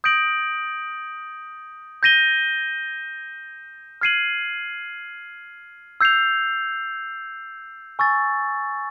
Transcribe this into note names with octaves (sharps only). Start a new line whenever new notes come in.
D#6 G6 A#6 D7 F#7
G6 A#6 D#7 G7
F6 G#6 C7 D#7 F#7
E6 G6 C7 F7
G#5 C#6 E6 A6